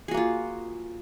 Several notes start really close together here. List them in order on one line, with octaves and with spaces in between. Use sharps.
G#4 F#4 A#3 F4